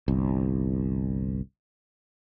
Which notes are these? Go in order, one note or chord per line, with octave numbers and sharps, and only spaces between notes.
G1 C2